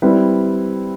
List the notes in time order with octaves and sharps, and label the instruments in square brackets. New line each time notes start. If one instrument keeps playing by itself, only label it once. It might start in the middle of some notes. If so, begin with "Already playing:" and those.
[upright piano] G3 C4 E4 B4